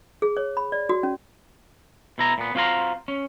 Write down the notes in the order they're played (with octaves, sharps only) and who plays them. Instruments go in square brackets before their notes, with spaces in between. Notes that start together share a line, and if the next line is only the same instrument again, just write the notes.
[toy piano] G#4
C#5
B5
D5
F#4
C#4
[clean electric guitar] B2 E4 A#5
A#2 B3
C4 F4 F#4 F5 A#5 C6
C#4